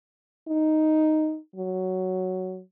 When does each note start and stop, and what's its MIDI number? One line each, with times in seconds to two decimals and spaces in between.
0.49 1.38 63
1.56 2.61 54